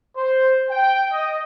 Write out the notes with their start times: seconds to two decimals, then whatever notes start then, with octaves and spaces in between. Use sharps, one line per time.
0.15 C5
0.70 G5
1.11 D#5